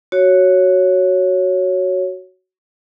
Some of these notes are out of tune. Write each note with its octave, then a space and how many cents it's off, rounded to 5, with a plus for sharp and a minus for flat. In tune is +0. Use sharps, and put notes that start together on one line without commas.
F#4 +5 C#5 +0